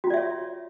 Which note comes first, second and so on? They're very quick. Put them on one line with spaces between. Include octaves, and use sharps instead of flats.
F#4 F4 D5 E5 C#5